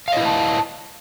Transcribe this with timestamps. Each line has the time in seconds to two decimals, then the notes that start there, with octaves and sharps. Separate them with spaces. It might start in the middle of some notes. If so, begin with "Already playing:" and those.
0.08 F5
0.12 D#5
0.17 E4
0.21 B4
0.25 A5